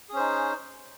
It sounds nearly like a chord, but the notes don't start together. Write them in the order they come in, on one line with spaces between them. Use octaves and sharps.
G#4 C#4 C5 D#4